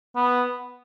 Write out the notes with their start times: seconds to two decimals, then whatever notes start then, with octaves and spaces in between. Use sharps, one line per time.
0.16 B3